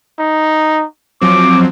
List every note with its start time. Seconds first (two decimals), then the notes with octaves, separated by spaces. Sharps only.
0.19 D#4
1.22 F3 F#3 C4 D6